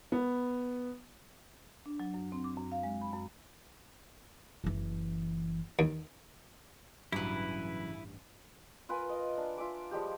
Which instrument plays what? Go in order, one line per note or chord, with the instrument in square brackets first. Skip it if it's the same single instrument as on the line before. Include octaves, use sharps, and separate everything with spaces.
[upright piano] B3
[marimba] D4
F#3
F#2
C4
D6
F#2
F5
G#3
B5
F#2
[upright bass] F#1 E3
[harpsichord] D#2
[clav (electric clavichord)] A1 G2 [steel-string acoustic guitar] C#3 E3 [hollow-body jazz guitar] F#3 [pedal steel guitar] E4 B4
[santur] F4 A#4 B4 G#5
D#5
D4
F4 E5 G#5 D6
F3 G3 G#3 G4